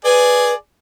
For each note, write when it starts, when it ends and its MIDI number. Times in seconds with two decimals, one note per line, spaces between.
0.05 0.54 68
0.05 0.54 71
0.05 0.54 74
0.05 0.54 80